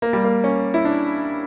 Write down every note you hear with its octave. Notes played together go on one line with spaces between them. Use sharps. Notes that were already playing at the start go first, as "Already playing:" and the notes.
A#3
G3
A#3
C#4
E4
D4